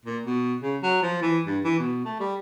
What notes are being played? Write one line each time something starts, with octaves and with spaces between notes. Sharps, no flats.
A#2
B2
C#3
F#3
F3
E3
G2
E3
B2
A3
G3